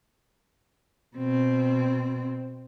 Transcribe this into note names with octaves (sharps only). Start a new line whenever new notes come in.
B2 C4